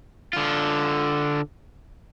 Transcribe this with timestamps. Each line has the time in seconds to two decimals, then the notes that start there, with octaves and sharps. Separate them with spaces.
0.33 D3 F4